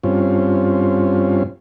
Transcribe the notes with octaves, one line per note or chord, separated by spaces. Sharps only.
G2 C4 C#4 F4